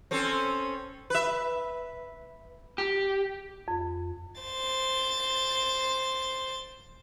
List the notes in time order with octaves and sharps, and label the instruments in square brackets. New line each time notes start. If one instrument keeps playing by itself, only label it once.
[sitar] C4 C#4 A4
B4 E5
[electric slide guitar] G4
[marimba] F2
[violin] C5 A6